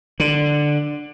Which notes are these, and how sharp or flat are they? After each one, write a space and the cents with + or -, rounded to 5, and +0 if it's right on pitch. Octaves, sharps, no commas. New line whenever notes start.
D3 +10